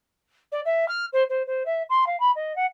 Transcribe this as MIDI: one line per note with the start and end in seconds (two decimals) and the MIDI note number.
0.52 0.61 74
0.65 0.87 76
0.88 1.05 89
1.13 1.23 72
1.29 1.42 72
1.47 1.63 72
1.65 1.82 76
1.89 2.04 84
2.06 2.19 77
2.20 2.31 83
2.35 2.55 75
2.56 2.66 78